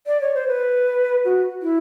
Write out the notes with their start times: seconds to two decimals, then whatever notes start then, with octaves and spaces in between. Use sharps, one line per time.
0.07 D5
0.21 C#5
0.35 C5
0.48 B4
1.25 F#4
1.62 E4